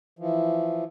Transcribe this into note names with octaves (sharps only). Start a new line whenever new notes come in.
E3 F3